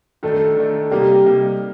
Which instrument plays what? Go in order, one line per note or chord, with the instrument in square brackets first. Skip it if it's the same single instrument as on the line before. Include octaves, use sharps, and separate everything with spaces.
[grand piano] D#3 A3 D4 [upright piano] A4
[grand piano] D#3 A3 D4
[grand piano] C3 G3 A#3 D#4 [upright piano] G4
[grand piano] C3 G3 A#3 D#4